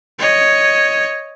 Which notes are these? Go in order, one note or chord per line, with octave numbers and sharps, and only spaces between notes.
C#5 D#5